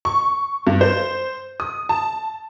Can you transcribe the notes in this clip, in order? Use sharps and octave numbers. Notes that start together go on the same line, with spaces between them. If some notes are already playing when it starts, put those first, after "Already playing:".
C#6
G2
C5
D#6
A5